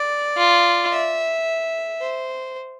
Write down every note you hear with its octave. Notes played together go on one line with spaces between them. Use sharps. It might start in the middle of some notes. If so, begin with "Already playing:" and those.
Already playing: D5
F4
E5
C5